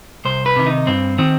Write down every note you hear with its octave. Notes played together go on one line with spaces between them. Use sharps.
C2 C5
B4
C3 D#3
D#4
G2 C4
D#3 C4